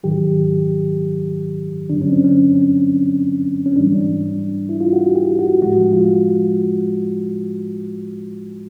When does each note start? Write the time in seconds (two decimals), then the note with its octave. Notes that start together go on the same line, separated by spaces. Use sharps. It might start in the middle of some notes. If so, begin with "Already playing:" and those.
0.03 G#2 D#3 F#3 G4
1.90 G2 D3 F#3 D4
2.02 C#4
2.12 C4
2.24 C#4
3.66 C#4
3.76 G#2 E3 G3 D4
4.69 E4
4.80 F4
4.93 F#4
5.15 G4
5.39 F#4
5.62 A2 F3 G#3 F#4
5.93 F4